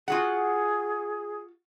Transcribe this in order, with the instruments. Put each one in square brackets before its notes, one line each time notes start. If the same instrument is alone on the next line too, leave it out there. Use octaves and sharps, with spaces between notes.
[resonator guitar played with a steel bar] F4 F#4 F#5 [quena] G#4